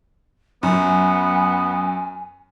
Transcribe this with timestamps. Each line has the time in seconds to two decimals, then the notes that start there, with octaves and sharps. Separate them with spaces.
0.63 F#2 B3 G#5